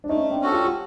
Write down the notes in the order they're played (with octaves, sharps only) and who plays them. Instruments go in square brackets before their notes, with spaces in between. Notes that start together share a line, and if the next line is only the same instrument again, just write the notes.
[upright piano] D4
[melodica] A3 [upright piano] C#4 D#4
[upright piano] C4 D4
[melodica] C#4 F#4 A4
[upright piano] F4 G4
G4